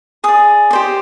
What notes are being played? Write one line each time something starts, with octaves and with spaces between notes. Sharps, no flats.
G#4 D5 D#6
G4 C5 D#5